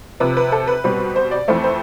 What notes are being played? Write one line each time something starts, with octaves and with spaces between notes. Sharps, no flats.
C3 F3 C4 B4
B4
A4
B4
B2 G3 C4
C5
D5
F2 E3 A3 C4 C5
C5